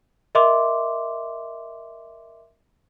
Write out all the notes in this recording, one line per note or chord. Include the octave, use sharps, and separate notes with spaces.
A#4 D#5 E5 C6 D6